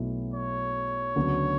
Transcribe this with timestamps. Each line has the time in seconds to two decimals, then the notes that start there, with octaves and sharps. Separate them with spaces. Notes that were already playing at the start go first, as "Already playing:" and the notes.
Already playing: B1 B2 A3 E4
0.34 C#5
1.16 D2 C#3 F#3 B3 D4